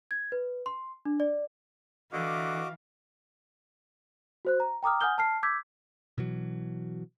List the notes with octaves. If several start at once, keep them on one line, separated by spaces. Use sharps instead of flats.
G#6
B4
C6
D4
D5
D3 E3 F#4 D#5 F5 D6
F#4 C5 F#6
A#5
G5 A#5 D6 D#6 F6
F#5 G#5 D#6 F6 G6 G7
A5 F6 C7
D6 E6 G6 G#6 B6
B2 E3 F#3